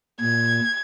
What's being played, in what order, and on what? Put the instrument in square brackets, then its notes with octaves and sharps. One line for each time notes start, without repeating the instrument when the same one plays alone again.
[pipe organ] A#2 [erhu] G#6